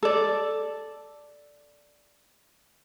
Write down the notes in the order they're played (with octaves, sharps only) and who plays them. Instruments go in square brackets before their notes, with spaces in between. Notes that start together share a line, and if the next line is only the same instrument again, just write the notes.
[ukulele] A4 D5